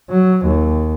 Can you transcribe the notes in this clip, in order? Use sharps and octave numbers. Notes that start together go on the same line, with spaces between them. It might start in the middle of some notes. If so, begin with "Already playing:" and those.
F#3
D#2